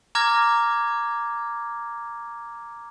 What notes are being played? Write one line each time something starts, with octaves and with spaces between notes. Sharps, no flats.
A#5 D6 F6 G#6 A#6